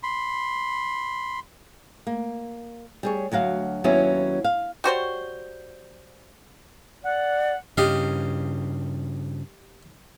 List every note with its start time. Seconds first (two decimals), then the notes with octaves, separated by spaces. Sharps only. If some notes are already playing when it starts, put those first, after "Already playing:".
0.03 B5 C6
2.07 A#3
3.03 G3 G#4 C#5
3.32 D2 F#3 F#4 F5
3.84 D#2 F#3 B3 C#4 E4 C#5
4.44 F5
4.84 G3 F#4 C5 C#5
7.04 D5 F#5
7.77 G2 C#3 G4 D#5 F5